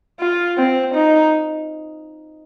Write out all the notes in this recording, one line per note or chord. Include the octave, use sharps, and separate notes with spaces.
F4
C4
D#4